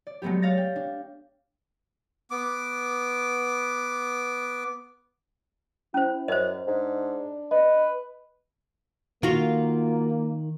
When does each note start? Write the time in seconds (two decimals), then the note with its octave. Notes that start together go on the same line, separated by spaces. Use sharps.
0.07 D5
0.22 F#3 G#3 A3 B3 G4
0.42 C#5 F5 F6 A6 A#6
0.57 G5
0.76 D4
2.31 B3 D6
5.94 C#4 E4 C5
6.28 F#2 C5 D#5
6.67 G#2 D4
7.51 B4 D#5
9.23 D#3 A#3 F4 F#4